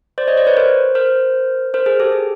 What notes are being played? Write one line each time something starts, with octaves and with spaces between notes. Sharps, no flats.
C5 D5
C#5 D#5
C5 D5
B4 C#5
A#4 C5
A#4 C5
A#4 C5
G#4 A#4
G4 A4
G#4